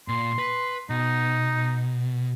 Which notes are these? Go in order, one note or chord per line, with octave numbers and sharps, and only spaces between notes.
A#2 C6
B4
B2 D#4